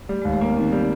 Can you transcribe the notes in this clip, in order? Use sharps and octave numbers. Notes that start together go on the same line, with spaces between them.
G3 A3
D#2 G#3
A3
A#3 B3
D#3 C4
G3